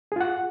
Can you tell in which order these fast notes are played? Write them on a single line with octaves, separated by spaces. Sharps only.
G#4 F4 F#5